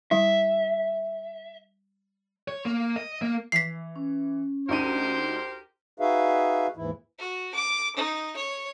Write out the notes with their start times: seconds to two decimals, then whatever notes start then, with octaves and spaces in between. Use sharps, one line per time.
0.11 G3 E4 E5
2.48 C#5
2.65 A#3
2.96 D#5
3.22 A#3
3.52 E3 B6 C7
3.96 C#4
4.69 D2 D#4 G4 A#4 C5 D#7
6.00 D#4 F#4 G#4 B4 E5 F5
6.77 D#2 G#2 E3 E4
7.18 F#4
7.55 D6
7.96 D#4
8.36 C#5